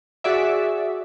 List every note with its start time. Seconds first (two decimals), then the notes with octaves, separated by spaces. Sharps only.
0.24 F#4 G#4 D5 E5